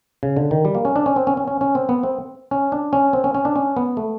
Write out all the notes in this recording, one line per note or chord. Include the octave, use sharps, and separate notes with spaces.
C#3
D3
D#3
G3
A#3
C#4
D4
C#4
C4
C#4
C#4
C#4
C#4
C4
B3
C4
C#4
D4
C#4
C4
C#4
C#4
D4
C#4
B3
A3